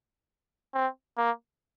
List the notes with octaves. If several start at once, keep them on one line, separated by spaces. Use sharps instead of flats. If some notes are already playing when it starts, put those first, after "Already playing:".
C4
A#3